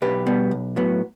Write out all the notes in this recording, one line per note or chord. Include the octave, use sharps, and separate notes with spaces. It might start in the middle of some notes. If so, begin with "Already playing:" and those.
B1 G4 B4
B2 G3 B3
B1
A2 F#3 B3